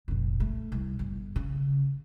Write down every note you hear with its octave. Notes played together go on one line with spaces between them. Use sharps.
F1 A#1
A3
C2
G1
C#3